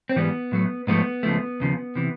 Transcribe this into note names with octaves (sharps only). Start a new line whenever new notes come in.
C4
G#2 E3 G3 B3
A2 F#3 A3
G#2 F3 A3 B3
C#2 C#3 F3 A3
D#2 C#3 F3
C3 E3